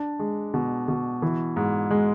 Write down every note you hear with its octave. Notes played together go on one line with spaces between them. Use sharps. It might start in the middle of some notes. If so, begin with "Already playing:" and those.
Already playing: D4
G#3
B2
B2
E3
G#2
G#3